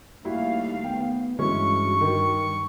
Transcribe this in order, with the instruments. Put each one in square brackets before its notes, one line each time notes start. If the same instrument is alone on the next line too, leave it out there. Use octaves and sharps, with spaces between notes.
[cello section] D#2 A3 F5 [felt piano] G3 E4 F#4
[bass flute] B3 [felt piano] G5
[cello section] G2 [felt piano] E3 G#3 C#4 [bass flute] F#4 [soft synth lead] C#6
[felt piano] D#3